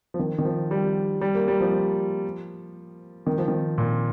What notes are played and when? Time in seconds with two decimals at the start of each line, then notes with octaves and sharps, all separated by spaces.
0.14 F3
0.19 D#3
0.38 D#3
0.45 F3
0.71 G3
1.21 G3
1.35 A#3
1.48 G3
1.61 F3
3.27 D#3
3.38 F3
3.48 D#3
3.78 A#2